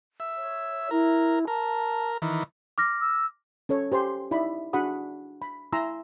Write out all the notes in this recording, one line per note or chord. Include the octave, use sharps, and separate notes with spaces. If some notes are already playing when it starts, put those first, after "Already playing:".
E5
C#5
E4 A#4
A#4 A5
D#3 E3
D6 F6 A#6
E6
C#4 A4 C#5
G4 C5 G#5 C6
D#4 E4 D5 D#5 B5
D4 F#4 G#4 F#5 B5 D#6
B5
E4 G#5 A#5 C6 E6